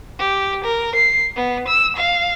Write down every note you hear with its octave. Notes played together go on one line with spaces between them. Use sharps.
G4
A#4
C7
B3
E6
F5